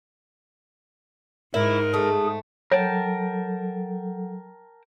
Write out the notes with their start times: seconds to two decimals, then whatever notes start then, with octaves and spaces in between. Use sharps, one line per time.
1.54 G#2 E4 A#4
1.94 A3 G#4
2.72 F#3 A4 A#4 C#5 G5 A5